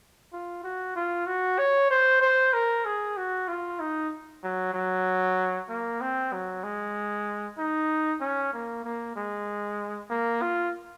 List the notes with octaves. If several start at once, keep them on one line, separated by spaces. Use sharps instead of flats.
F4
F#4
F4
F#4
C#5
C5
C5
A#4
G#4
F#4
F4
D#4
F#3
F#3
A#3
C4
F#3
G#3
D#4
C#4
A#3
A#3
G#3
A#3
F4